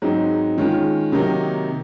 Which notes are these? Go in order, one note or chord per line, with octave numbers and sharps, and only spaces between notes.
G#2 F#3 C4 D#4
D#3 G#3 C#4 F4
C3 D#3 F#3 A#3 D#4